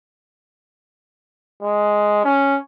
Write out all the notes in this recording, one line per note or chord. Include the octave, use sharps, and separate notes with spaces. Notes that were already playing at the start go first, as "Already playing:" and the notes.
G#3
C#4